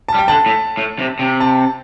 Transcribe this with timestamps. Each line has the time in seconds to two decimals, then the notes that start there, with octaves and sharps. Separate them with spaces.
0.08 A5
0.14 G3
0.19 G5
0.28 D3 A5
0.46 A2
0.77 A2
0.99 C3
1.19 C3
1.40 A5